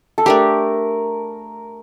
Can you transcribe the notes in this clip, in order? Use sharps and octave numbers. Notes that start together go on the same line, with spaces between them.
A4
A3 D4 G4 A#4